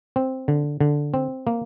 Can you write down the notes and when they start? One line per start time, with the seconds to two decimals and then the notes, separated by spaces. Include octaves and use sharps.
0.16 C4
0.48 D3
0.81 D3
1.14 C4
1.47 A#3